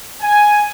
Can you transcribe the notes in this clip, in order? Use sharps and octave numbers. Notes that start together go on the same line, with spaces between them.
G#5